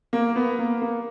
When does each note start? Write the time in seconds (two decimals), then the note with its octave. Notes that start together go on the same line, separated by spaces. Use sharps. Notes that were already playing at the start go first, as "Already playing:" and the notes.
0.13 A#3
0.36 B3
0.59 A#3
0.82 A#3